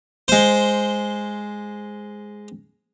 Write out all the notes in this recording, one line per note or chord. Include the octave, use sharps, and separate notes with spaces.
G#3 C5